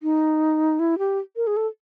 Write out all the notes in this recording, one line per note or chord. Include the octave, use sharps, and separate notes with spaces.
D#4
E4
G4
A#4
G#4
A4